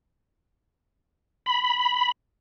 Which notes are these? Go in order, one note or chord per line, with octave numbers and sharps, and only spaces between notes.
B5